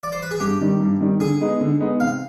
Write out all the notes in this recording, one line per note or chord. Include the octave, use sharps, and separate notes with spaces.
D5
C5
B4
G#4
G2 G4
D#3 G3
G2
D#3 G3
D3 G#4
G#3 B3 D#4
D3
G#3 B3 D#4
C3 F5